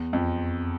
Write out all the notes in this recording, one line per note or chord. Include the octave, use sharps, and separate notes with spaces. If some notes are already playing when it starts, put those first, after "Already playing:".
Already playing: E2
F2